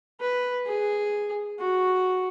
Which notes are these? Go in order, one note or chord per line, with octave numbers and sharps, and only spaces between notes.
B4
G#4
F#4